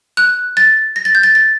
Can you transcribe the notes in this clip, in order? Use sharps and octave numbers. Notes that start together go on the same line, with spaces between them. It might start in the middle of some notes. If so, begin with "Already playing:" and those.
F#6
A6
A#6
A6
G6
A6
A6